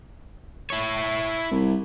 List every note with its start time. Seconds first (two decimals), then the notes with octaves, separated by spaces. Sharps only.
0.70 E4 C#5
1.51 C2